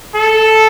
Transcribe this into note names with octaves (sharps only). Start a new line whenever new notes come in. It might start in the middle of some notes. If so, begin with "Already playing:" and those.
A4